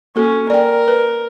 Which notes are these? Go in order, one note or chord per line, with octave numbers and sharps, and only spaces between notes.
A#3 C#4 F#4 A4
A#4 D5 G5
B4